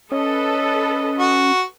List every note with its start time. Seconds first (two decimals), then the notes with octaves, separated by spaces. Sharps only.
0.12 C#4 A4 B4 D#5
1.19 F#4